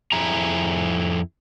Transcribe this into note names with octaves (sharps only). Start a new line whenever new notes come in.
F2 E4 G#4 A#5